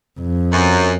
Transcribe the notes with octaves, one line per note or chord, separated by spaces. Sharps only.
F2
F#2